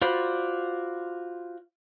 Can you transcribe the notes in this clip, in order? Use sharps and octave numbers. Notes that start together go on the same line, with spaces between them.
F4 F#4 C5 D5 B5